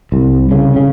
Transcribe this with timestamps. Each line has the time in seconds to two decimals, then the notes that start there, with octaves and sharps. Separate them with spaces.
0.12 C2
0.51 C#3
0.76 C#3